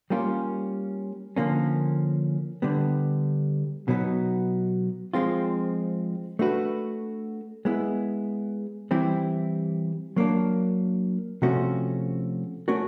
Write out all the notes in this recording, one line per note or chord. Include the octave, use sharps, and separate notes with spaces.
G3 A#3 C#4 F4
D3 F3 A#3 C#4
D3 G3 B3
B2 F#3 B3 D#4
F3 G#3 C4 F4
A3 D4 F#4 B4
G#3 B3 E4
E3 G3 C4 E4 G4
F#3 A#3 D4
C3 F3 A3 C#4 F#4
A3 C#4 F#4 A#4 C#5